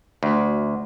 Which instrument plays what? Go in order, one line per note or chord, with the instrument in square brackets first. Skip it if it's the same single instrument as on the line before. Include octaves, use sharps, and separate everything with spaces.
[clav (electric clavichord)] D2